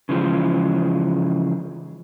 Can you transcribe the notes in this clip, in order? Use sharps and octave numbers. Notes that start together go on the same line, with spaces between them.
C#3 E3 F3 G#3